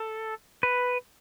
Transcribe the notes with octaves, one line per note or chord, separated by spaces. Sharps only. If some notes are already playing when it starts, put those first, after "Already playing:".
Already playing: A4
B4